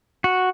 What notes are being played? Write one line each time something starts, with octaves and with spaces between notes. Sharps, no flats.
F#4